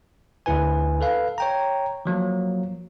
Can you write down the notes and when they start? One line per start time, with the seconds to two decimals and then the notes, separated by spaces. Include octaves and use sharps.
0.46 D2 E4 B4 G#5
1.01 A4 B4 F5
1.38 C#5 G5 A#5
2.06 F3 F#3 A#3